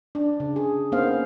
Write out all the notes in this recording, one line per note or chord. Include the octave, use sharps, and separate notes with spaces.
D4
C#3
G#4
A#3 B3 C#4 D#4 C5 F5